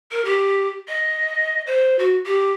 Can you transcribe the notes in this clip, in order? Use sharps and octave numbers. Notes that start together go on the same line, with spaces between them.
A#4
G4
D#5
C5
F#4
G4